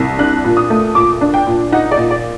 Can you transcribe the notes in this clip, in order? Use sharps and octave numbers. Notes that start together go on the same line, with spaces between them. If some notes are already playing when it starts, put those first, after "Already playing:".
Already playing: C2
D4 F#6
A#2
D#6
A3
A#2 D6
D4
G5
A#2
D#4 F#5
D5
A#2
D5